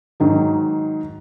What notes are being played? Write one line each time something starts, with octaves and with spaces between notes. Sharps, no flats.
G#2 D#3 F#3